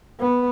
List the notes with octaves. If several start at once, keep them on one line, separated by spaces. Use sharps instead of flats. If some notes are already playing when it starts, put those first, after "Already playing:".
B3